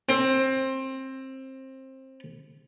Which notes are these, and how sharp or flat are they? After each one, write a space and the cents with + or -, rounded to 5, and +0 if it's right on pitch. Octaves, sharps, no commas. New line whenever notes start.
C4 +20